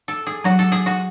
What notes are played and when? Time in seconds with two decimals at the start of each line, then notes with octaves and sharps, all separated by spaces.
0.08 A4
0.27 G#4
0.44 F#3 F#4
0.59 A4
0.72 G#4
0.86 F#4